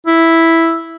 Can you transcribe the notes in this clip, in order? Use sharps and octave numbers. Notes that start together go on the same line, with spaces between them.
E4